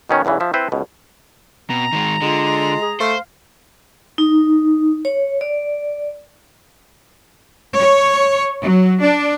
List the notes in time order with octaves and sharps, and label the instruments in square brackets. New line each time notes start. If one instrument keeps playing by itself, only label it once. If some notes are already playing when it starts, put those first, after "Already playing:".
[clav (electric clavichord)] B2 D#3 C#4
B1 E2 C#3 E3
F3 E5
C4 E4 B4 C5
C#2 B2
[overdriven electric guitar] B2 [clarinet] C4 [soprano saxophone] A#5
[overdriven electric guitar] D#3 G#3
[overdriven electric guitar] D3 [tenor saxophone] G#3 [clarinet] F4
[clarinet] G#4
[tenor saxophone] A3 [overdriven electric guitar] C5 [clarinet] F5
[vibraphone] D#4
C#5
D5
[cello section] C#5
F#3
D4